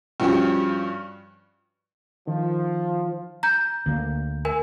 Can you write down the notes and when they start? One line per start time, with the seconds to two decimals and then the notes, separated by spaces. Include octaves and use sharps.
0.20 G2 F3 C#4 F#4 G4
2.27 D#3 F3
3.43 A#5 G6
3.86 D2 A#3
4.45 A#4 G#5